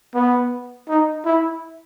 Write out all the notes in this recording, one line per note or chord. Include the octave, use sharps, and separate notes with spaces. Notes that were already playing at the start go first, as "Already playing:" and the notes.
B3
D#4
E4